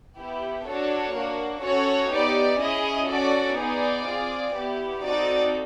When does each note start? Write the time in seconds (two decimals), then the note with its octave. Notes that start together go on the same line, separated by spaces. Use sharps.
0.17 B3 E4 G4
0.66 D4 F#4 A4 C#5
1.14 A#3 D4 F#4
1.63 C#4 F#4 A4 C#5
2.11 B3 D#4 G4 D5
2.60 C#4 E4 G#4 D#5
3.09 C#4 F#4 A4 D5
3.57 B3 D#4 G#4 D5
4.06 C4 F4 G#4
4.55 B3 E4 G4
5.03 C4 D#4 F#4 A4 D5